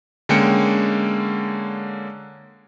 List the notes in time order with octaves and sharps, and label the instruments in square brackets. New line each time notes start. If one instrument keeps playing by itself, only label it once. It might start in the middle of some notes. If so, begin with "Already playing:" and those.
[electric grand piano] D3 G#3 A#3 C#4 G5 C#7